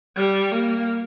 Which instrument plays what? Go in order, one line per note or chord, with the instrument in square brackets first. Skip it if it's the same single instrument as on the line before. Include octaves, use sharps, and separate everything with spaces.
[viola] G3
A#3